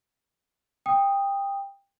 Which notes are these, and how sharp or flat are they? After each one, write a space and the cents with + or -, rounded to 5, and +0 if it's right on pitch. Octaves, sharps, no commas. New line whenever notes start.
G5 +20 D#6 +0